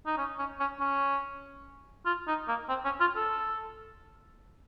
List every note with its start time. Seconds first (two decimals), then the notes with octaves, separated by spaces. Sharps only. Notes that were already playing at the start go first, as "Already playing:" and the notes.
0.06 D#4
0.17 C#4
0.38 C#4
0.60 C#4
0.80 C#4
2.06 F4
2.27 D#4
2.48 A#3
2.69 C4
2.85 C#4
3.00 F4
3.16 A4